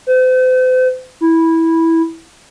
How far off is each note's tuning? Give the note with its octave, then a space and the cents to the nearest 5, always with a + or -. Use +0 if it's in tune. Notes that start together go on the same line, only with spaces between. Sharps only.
C5 -40
E4 -10